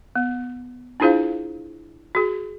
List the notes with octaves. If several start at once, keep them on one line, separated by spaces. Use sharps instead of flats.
B3
D4 E4 F4 G#4 C5 F5
F#4 G#4